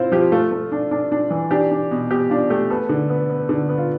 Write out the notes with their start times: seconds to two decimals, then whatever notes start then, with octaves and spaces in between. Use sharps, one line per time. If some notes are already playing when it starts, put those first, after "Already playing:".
Already playing: C4 E4 F4 C5
0.12 F3 G4
0.32 A3 F4
0.51 A3
0.72 D4
0.91 D4
1.12 D4
1.31 E3
1.51 D4 G4
1.71 D4
1.91 B2
2.11 B2 G4
2.30 D4 F4
2.50 A3 G4
2.70 B3 A4
2.89 D3
3.10 B3
3.29 B3
3.49 D3
3.69 B3
3.78 F4